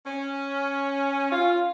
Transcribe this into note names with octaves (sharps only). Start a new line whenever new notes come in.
C#4
F4